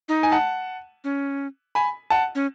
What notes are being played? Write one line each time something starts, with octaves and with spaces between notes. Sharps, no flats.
D#4
G#5
F#5 A5
C#4
G#5 B5
F#5 A5
C#4